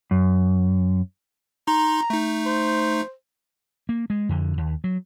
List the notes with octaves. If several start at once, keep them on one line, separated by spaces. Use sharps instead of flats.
F#2
D#4 A#5 C6
A3 D#4
C5
A#3
G#3
F2 D3
D#2
F#3